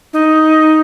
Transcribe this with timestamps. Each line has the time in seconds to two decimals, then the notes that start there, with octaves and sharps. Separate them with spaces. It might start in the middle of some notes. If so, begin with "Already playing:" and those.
0.13 D#4